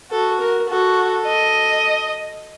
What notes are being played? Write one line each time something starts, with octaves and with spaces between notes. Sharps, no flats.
F#4 A4
A#4
F#4 A4
D#5